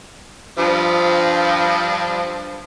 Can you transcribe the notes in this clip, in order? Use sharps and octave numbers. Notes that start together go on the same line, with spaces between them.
G2 F3